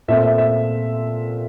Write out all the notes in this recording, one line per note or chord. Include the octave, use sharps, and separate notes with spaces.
A#2 A3 C4 E5
E5
E5